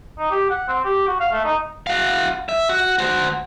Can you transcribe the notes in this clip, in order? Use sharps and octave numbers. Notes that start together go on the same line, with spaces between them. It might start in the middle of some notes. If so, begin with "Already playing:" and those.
D#4
G4
F#5
C4
G4
F#4
F5
A3
D#4
F#4 F5
E5
F#4
F#4 C5